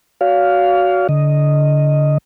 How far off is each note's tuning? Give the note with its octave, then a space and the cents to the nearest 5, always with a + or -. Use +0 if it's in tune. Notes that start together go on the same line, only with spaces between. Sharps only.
F#4 +5 C#5 +45 F5 +0
D3 -20 D#5 +0